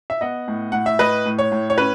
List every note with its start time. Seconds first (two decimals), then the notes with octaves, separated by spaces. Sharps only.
0.10 E5
0.21 B3 D#5 F#5
0.48 A2
0.72 A2 F#5
0.86 E5
0.99 A2 B4 D#5
1.26 A2
1.39 C#5
1.52 A2
1.70 C#5
1.78 C#4 B4